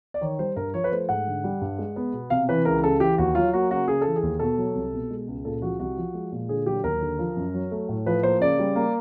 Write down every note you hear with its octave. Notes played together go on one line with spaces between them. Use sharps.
D5
D#3 C#5
G3 C5
G2 A#4
F3 C#5
B4
A3 C5
G#2 F#5
D3
G3
G2
G#3
B3
B2
C3 F5
E3 B4
C#2 A#4
C#3 A4
E3 G4
D#2 F#4
F#3 F4
A#3 F#4
C#3 F#4
C#3 G#4
E3 A4
G#4
D#2
B2 A4
F#3
C2
B2
G#3
C#2
A#2 A4
F3 F#4
C2 F#4
F3
G#3
A#2
D3 G#4
F#3 G4
D#2 A#4
D3
F3
F#2
F#3
A3
A2
F3 B4
A#3 C5
C#3 D5
G3
A#3